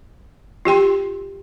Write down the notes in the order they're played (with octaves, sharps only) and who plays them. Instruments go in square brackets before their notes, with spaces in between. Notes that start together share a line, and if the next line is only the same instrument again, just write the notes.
[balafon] F4 G4 G5 C6